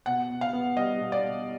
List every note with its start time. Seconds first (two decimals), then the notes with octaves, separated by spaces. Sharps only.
0.06 B2 F#5
0.30 B2
0.41 F5
0.53 B3
0.77 G3 D#5
1.00 B2
1.12 D5
1.24 B2